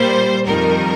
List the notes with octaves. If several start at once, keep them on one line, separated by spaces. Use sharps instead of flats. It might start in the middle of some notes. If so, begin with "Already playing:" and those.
Already playing: A#2 G3 C5
F2 D#3 G3 A#4